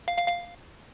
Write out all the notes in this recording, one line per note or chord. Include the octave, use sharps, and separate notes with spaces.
F5
F5
F5